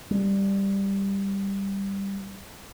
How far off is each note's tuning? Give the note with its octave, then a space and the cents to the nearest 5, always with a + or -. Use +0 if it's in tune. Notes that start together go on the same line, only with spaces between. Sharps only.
G3 +5